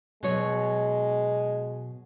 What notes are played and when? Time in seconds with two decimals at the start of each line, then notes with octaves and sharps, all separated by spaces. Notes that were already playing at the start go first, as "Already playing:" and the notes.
0.23 B2 F#3 G#3 C#5